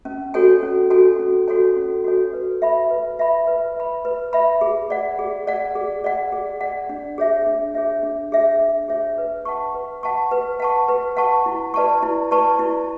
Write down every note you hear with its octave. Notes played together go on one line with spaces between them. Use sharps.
C#4
F#4 A4 C#5 G#5
C#4
F#4 A4 C#5 G#5
C#4
F#4 A4 C#5 G#5
C#4
F#4 A4 C#5 G#5
B4
E5 B5
B4
E5 B5
B4
E5 B5
B4
E5 B5
G#4
D5 F#5
G#4
D5 F#5
G#4
D5 F#5
G#4
D5 F#5
D4
G#4 C#5 E5
D4
G#4 C#5 E5
D4
G#4 C#5 E5
D4
G#4 C#5 E5
B4
F#5 A5 C#6
B4
F#5 A5 C#6
B4
F#5 A5 C#6
B4
F#5 A5 C#6
E4
B4 D5 A5 C#6
E4
B4 D5 A5 C#6
E4